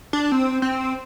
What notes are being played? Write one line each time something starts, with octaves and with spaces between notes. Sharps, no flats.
D4
C4
C4